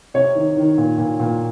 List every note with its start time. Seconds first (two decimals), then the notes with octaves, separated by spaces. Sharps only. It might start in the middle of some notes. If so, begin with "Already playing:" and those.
0.14 C3 C#5
0.35 D#3
0.57 D#3
0.78 A#2
0.98 A#2
1.20 A#2